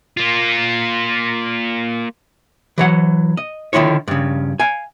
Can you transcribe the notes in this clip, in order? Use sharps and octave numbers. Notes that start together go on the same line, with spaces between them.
A#3 F4
E3 F#3 F#5
D#5
D3 D#3 E4 F4 C#5
G2 C#3
F5 G#5